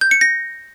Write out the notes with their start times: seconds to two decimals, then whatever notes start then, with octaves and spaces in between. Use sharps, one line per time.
0.01 G6
0.11 C#7
0.21 A#6